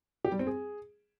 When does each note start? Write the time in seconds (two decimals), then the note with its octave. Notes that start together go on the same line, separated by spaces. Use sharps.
0.25 G4
0.32 G3
0.39 C4
0.47 G#4